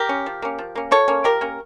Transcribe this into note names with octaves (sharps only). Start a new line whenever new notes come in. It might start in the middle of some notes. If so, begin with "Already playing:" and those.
Already playing: G4 A#4
C#4
F3
A#3 C#4
F3
A#3 C#4
F3 A4 C#5
A#3 C#4
F3 G4 A#4
A#3 C#4